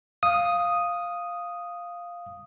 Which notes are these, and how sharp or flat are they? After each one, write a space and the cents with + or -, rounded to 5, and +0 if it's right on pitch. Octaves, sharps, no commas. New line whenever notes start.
F5 +0 D#6 +0